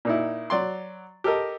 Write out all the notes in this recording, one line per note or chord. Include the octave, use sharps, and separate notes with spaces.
A#2 D#4 E4
F#3 D5 C6
G4 A4 A#4 D#5